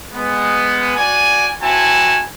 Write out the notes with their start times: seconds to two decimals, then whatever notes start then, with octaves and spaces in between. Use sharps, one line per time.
0.12 G#3 B3
0.96 F#4 D5 G#5
1.61 C4 E4 F#4 G#5 A5